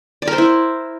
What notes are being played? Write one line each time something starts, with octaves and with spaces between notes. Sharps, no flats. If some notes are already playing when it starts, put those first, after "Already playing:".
D5
A#4
C5
E4